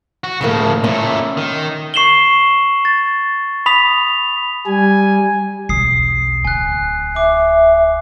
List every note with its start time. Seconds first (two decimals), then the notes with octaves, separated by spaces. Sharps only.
0.24 F#4
0.41 D2 A2 C#3 F3 A#3
0.84 A#2 A3 C#4
1.37 D#3
1.94 C#6 C7 E7 F#7 G7
2.85 A6
3.66 B5 D#6 B6 F7
4.67 G3 G#5
5.69 B1 E2 D#6 C7
6.45 D1 G#5 F#6
7.16 E5 D6